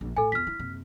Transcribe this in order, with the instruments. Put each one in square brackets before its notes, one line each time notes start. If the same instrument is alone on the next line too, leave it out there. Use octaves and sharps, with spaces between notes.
[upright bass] A#1
[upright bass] A2 [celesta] A4 G#5
[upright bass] E2 F4 [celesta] F6 B6
[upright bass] E4
F#1 C3